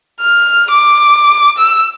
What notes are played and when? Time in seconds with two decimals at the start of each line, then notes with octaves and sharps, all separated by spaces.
0.22 F6
0.71 D6
1.58 E6